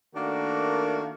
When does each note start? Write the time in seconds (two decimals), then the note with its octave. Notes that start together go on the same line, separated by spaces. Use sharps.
0.15 D#3 A3 A#3 D4 F#4